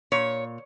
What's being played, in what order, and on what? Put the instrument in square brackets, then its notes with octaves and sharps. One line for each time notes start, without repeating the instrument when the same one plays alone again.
[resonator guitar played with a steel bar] A#2 C#5